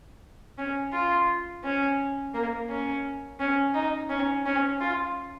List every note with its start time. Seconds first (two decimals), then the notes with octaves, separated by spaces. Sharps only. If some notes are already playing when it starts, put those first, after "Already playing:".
0.58 C#4
0.93 F4
1.64 C#4
2.34 A#3
2.69 C#4
3.40 C#4
3.74 D#4
4.10 C#4
4.46 C#4
4.81 F4